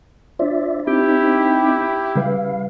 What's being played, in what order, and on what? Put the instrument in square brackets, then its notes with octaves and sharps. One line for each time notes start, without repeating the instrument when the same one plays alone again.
[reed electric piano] D4 C5 [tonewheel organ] F4 D5 E5
[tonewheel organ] C4 D#4 [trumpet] E4 [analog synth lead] G4
[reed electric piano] C#3 G3 B4 [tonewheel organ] F5